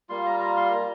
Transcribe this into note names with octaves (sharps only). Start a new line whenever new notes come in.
G3 A#3 F4 C6
A#5
A#5
C6
A#5